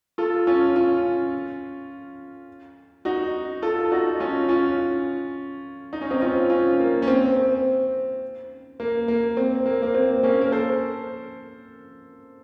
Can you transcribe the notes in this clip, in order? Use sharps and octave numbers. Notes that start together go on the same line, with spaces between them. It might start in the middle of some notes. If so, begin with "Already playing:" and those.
F4 A4
C#4 F4
C#4 F4
D#4 F#4
F4 A4
A4
D#4 F#4
C#4 F4
C#4 F4
D#4
C#4
C4 D#4
C#4 F4
C#4 F4
A#3
C#4
C4
C4
A#3
A#3
C4
A#3
A#3
C4
A#3 C#4
A#4
A4 C5